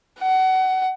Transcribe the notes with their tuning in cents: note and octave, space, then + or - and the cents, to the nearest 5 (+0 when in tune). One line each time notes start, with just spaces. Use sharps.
F#5 +25